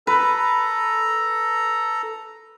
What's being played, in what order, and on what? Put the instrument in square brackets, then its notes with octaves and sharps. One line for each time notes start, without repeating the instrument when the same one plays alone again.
[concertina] A4 A#5 [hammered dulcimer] B4